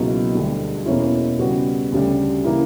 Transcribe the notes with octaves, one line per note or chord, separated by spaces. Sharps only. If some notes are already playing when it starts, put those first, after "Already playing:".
Already playing: C#2 B2 F#3 A#3 E4
D2 D3 G3
E2 B2 A#3 C#4 E4
C#3 G3 B3 F#4
D2 C#3 G3
C#3 E3 A#3 E4